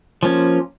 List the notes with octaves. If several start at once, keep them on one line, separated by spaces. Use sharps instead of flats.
F3 A#3 C#4